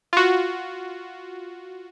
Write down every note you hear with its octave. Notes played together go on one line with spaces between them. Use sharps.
F4 F#4